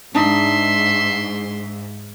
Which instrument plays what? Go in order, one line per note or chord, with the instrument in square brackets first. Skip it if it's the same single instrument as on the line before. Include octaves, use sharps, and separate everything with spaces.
[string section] G#2 [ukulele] D4 D#4 [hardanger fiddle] E5 C6